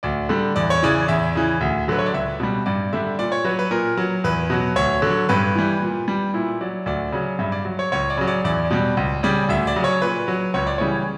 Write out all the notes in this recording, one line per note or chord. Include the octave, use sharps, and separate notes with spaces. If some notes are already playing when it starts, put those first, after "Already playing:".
D2 D5
D3 G3
E2 D5
C#5
C#3 E3 D5
E2 E5
C#3 E3
D2
D3 F#3 B4
C#5
D5
C#2 E5
B2 G3
G2 D5
D3 G3 E5
A#2 D5
C#5
F#3 B4
B4
A#2 A#4
F#3
E2 B4
B2 F#3
D2 C#5
D3 F#3
G2 B4
E3 G3
A#2
G3
A#2 E4
F#3 D5
D2 D5
C#3 F#3
G2 E5
D5
F#3
C#5
C#2 C#5
D5
C#3 F#3
D5
E2 D5
B2 G3
C#2
C#3 G3 D5
D2 E5
D5
C#3 F#3
C#5
A#2 B4
F#3
C#2 C#5
D5
C#3 E3 G3 C#5